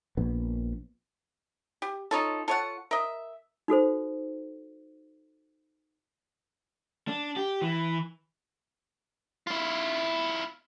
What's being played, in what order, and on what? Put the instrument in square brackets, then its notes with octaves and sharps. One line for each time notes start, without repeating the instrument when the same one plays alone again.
[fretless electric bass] A#1 B3
[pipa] G4
[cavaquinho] D#4 F4 A4 [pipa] C#5 A5
[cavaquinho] F4 A5 [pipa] A4 C#5 F#5
[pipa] A#4 D#5 [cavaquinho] E5
[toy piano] D#4 F#4 A4 C5
[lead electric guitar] D4
G4
E3
E4 F4